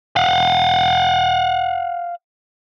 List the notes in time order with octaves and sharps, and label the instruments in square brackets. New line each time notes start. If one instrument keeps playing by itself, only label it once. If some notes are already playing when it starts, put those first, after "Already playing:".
[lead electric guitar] F5 F#5